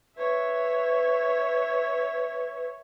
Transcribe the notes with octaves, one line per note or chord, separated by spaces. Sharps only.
B4 C#5 E5